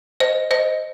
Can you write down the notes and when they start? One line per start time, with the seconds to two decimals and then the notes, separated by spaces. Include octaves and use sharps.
0.20 C5 D#5
0.51 C5 D#5